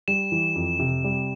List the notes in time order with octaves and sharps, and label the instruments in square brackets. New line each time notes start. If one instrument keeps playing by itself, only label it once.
[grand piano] G3 [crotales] E7
[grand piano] E3
F2
C3
G3